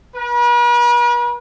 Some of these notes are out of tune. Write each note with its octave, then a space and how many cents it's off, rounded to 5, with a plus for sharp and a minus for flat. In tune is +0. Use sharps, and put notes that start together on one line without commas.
B4 -45